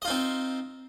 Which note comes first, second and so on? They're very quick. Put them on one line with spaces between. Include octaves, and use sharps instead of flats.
D#5 F4 D#4 C4